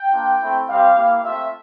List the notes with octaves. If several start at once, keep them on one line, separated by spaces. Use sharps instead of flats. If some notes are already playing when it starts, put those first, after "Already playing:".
Already playing: G5
A#3 D4 F4
A3 C4 E4
G3 C4 G4 F5
A#3 E4 G4
A3 C4 F4 E5